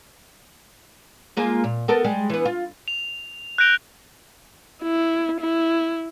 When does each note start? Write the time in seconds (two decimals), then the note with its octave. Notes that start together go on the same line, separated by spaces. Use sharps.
1.37 G#3 A#3 F4
1.64 A#2
1.88 B3 A4 A#4
2.04 G3 G#3
2.30 E3 B3
2.45 F4
2.88 F7
3.58 F#6 G6 A#6 D7 F7 G7
4.82 E4
5.40 E4